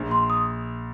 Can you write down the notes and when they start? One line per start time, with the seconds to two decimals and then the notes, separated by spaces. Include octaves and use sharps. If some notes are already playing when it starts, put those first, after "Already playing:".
Already playing: A#1
0.11 C6
0.30 D#6